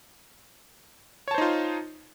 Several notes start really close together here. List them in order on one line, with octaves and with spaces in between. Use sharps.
C#5 A5 C5 D#4 F4